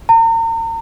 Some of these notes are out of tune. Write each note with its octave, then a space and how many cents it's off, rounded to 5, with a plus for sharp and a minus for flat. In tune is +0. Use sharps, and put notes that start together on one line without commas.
A#5 -40